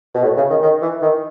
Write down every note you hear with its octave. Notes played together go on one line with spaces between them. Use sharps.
B2
A2
C#3
D#3
D#3
E3
D#3